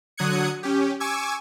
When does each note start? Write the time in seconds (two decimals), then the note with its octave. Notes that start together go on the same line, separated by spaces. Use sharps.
0.17 D3 F#3 D#6 F#6 G#6 C#7
0.63 C#4 G4
1.00 G#5 C#6 D6 E6 G#6